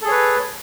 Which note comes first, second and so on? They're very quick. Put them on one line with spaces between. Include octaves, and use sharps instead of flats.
A4 G#4 C#5 B4